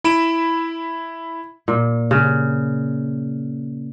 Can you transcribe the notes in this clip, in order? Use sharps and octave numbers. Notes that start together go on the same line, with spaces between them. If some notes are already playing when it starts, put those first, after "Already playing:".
E4 B5 D7 E7
A#2
C#3